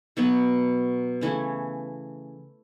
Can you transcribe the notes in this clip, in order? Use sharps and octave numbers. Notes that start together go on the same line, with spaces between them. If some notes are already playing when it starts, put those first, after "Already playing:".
B2 F#3 B3
C#3 E3 A3 C#4